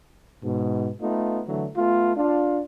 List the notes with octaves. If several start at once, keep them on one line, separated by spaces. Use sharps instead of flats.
G#2 B2
A3 B3 D#4 F4
D3 E3 F#3 A3
A3 B3 F4
D4 F4